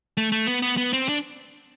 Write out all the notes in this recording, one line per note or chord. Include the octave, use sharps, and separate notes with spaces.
A3
A3
B3
B3
B3
C4
D4